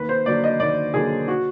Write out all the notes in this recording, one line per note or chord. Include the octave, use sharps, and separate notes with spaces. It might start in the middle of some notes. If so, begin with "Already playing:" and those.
Already playing: D#2 B4
C5
D3 F#3 A#3 D5
D#5
D#2 D5
D3 F#3 A#3 G#4
F#4